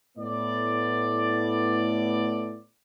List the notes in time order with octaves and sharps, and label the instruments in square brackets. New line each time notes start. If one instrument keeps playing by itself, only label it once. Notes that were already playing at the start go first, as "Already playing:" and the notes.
[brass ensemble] A2 B3 D5